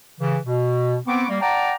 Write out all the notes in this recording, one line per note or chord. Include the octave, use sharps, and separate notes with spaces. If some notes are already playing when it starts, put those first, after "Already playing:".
C#3 E3
B2
B3 C4 C#6 D6
G3 A#3
D5 F#5 G5 A5 A#5